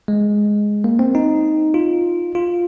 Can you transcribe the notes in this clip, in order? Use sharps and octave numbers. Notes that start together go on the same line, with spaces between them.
G#3
A#3
C4
D#4
F4
F4